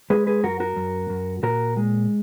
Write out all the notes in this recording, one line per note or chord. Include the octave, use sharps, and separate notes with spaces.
G#3 G#4 B4
G#4 B4
F#2 F#4 A#4
F#4 A#4
F#2
F#2
A#2 F#4 A#4
G#3